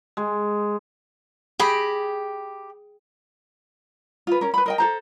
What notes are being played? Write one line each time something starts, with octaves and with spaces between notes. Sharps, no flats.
G#3
G4 G#4 G5 B5 A#6
F4 B4
C#4 A#4
B4 B5
A#4 D#5 G5
A4 C5 A#5